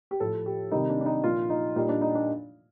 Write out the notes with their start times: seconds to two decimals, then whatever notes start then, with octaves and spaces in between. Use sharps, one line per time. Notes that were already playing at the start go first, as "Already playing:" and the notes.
0.11 G4
0.20 A2 F3 A4
0.46 G4
0.71 C3 D#3 G3 D#4
0.89 D4
1.01 D4
1.06 D#4
1.24 A#2 F3 F4
1.50 D#4
1.76 A#2 G3 D#4
1.89 D4
2.02 D#4
2.15 D4